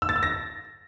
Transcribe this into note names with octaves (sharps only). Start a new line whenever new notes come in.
E6
A6
E6
A#6